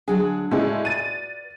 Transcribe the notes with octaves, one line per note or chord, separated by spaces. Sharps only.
D2 F#3 D4 G#4
A2 C#3 G#3 F#4 B4 D5
A6 D#7